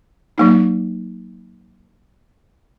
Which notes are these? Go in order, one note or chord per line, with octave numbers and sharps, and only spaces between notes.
F#3 A#3 D#4